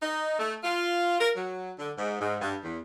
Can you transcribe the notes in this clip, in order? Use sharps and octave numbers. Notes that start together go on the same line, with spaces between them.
D#4
A3
F4
A#4
F#3
D3
G#2
G#2
G2
E2